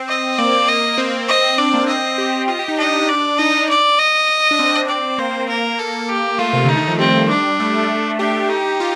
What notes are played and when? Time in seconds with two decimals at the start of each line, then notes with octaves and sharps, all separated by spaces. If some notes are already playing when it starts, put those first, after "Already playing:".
Already playing: C4
0.08 D#5
0.32 C4
0.39 A#3 D5
0.69 D#5
0.98 C4
1.28 D#5
1.58 D4 D5
1.74 A#3
1.88 C4 D#5
2.18 G4
2.48 F4 D#5
2.59 G4
2.68 D#4
2.78 D4 D#5
3.09 D5
3.38 D#4 D#5
3.69 D5
3.99 D#5
4.51 D4
4.59 C4
4.89 D5
5.18 A#3 C5
5.49 A#4
5.79 A4
6.09 G4
6.39 A3 F4
6.53 C3
6.64 D3 D#4
6.76 D#3
6.88 F3
6.99 G3 C4
7.29 D4
7.60 A3
8.19 D4 G4
8.50 D#4
8.80 F4